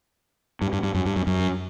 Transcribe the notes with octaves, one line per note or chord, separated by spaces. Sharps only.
G2
G2
G2
F#2
G2
F#2
F#2